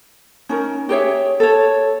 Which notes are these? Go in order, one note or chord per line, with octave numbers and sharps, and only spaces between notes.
C#4 D#4 A#4
G4 G#4 C#5 E5
A4 C#5